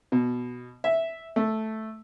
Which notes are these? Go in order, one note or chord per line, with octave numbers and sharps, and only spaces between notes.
B2
E5
A3